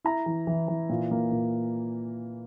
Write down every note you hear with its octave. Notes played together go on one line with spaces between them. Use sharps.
E4 A#5
E3
E3
E3
A#2
A#3
A#2